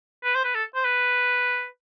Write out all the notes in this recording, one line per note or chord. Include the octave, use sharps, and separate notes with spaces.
B4
C5
B4
A4
C5
B4